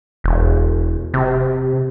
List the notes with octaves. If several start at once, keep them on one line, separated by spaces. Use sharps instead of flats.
E1
C3